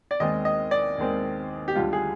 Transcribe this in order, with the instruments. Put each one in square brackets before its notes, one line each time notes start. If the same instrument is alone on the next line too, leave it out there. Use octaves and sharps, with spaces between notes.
[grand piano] D5
D#2 D#3 G#3 C4 D#5
D#5
D5
D#2 D#3 G#3 C4
G4
D2 D3 G3 F4
G#4